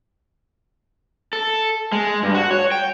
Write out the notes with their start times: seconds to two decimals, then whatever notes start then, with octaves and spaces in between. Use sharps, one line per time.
1.33 A4
1.92 G#3
2.23 G2
2.35 F#4
2.51 C#5
2.71 G5